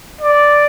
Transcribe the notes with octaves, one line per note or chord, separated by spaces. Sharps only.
D5